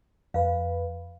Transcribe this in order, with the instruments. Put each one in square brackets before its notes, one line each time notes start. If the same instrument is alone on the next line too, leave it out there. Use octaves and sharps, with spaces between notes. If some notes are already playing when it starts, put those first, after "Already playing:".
[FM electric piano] F2 B4 [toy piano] F5